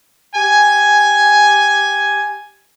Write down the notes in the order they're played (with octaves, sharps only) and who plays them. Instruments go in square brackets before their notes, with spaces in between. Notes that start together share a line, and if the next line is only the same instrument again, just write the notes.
[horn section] G4 G#5